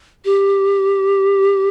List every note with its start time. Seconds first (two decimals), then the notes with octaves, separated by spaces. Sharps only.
0.25 G4